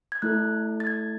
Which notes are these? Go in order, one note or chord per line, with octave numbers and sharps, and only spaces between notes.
G#6
A3 E4 A4 F#6
A6
G#6